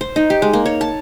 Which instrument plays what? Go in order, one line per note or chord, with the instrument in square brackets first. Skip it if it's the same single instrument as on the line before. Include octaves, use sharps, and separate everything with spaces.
[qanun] C5
D#4
G4
G#3
A#3
C#5
A5